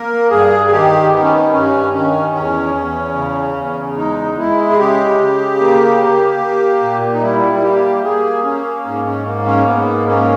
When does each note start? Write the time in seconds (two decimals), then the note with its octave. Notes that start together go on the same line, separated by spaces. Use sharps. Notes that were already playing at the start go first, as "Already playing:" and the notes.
Already playing: A#3 A#4
0.31 G2 G#4
0.66 G#4
0.71 D#3 G4
1.12 D#3 B3
1.23 C#4
1.33 B3
1.53 G2 C#4
1.93 D#3 C#4
2.34 E2 C#4
2.75 E2
3.15 C#3
3.56 E2
3.97 G#3 D#4
4.37 G#3 E4
4.70 G#4
4.78 C#3 G4
5.19 C#3
5.60 A#3
6.00 A#3
6.41 A#3
6.82 A#2
7.14 D#4
7.22 G3 E4
7.56 E4
7.63 A#3 G4
8.04 A#3 G#4
8.44 A#3 C#4
8.85 G#2 C#4
9.06 C#4
9.26 A#3
9.46 C#4
9.66 G#2 B3
10.07 A#3 C#4